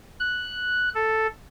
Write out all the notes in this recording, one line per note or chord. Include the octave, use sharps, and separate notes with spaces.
F#6
A4